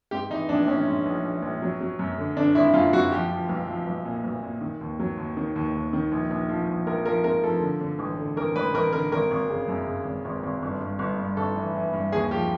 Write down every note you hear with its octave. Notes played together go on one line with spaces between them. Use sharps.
G#2 G4
E3 D#4
A#1 D4
A#1 C#4
G#2
A#1
A#1
A#1
F#3
F#3
F#2
D3
D3 D4
G#1 E4
F#2 F4
F#2 F#4
F3 G4
F3
B1
F3
B1
A#2
B1
A#2
D#3
D#2
F#3
D#2
D#3
D#2
D#2
D#3
A#1
A#1
F3
A#1
A#1 A#4
F3 A#4
G#2 A#4
F3 A4
D3
D3
A1
D3
A1 A#4
A1 B4
A1 A#4
D3 A#4
G#1 A#4
G#1
C#3
F#2
C#3
G#1
G#1
G#1
G1
G2
G1
G2
G1 A4
E3
E3
G2
D#2 G#4
F3 G4